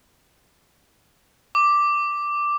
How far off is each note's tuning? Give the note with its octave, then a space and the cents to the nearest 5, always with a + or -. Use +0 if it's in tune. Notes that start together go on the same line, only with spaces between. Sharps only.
D6 +0